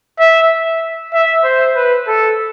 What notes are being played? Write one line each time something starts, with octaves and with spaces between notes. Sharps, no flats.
E5
E5
C5
B4
A4